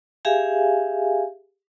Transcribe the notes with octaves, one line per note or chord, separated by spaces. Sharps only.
G4 G#4 E5 F5 G#5